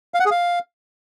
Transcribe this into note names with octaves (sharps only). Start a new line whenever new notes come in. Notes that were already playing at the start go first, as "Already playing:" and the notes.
F5
F#5
G#4
F5